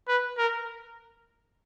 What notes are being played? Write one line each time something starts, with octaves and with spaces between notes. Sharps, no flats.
B4
A#4